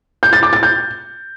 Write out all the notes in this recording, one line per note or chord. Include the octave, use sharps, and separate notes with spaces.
G6
A6
D6
A6
G6